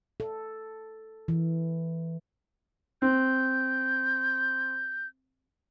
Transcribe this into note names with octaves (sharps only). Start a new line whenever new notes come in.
A4
E3
C4 G6